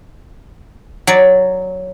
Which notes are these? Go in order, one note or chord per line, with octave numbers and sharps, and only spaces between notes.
F#3 D5